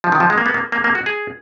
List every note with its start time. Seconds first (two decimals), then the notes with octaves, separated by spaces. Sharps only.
0.04 F3
0.12 D#3
0.20 F3
0.30 G#3
0.38 A#3
0.46 B3
0.54 A#3
0.72 A#3
0.84 A#3
0.95 F#4
1.06 G#4